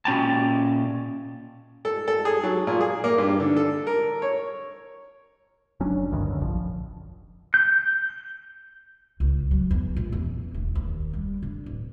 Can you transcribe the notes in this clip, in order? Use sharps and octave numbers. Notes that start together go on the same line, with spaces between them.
A#2 C#4 G5 A5
A4
A4
G#4
F#3
A#2
G#4
A#3
G2
D3
A4
A#4
C#5
F#1 F#3 C#4 D4
G#1 D2 G2 D#3
F#2 D3
F1 A#1 F3
G6
C#2
F#3
E2
A#1
E2
D#1
D#2
G3
D3
D1